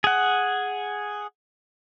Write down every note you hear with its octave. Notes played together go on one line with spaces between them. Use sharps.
G#4 F#5